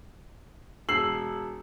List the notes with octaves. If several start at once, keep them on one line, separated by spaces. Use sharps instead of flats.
E1 E6 C7 F#7